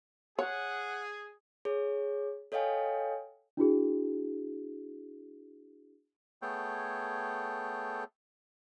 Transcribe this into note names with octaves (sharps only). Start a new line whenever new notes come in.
G#4 C#5 F#5
G#4 C#5
A4 C#5 D#5 F5 G5 G#5
D4 E4 F#4 G#4
A3 B3 G#4 A4 C#5 G5